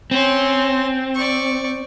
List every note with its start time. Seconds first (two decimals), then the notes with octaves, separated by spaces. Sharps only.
0.11 C4 C#4 C6
1.15 D5 C#6